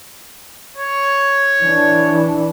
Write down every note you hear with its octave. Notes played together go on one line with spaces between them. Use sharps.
C#5
E3 D4